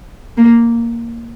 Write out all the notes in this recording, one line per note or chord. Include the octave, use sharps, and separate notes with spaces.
A#3